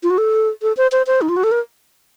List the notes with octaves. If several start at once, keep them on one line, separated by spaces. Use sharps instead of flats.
F4
F#4
A4
A4
C5
C5
C5
D#4
F4
F#4
A4
A#4